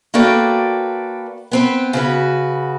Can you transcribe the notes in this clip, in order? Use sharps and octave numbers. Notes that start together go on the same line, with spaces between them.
A#3 F#4 A4 B4 D5 G5
B3 C4 B4
C#3 F#4 B4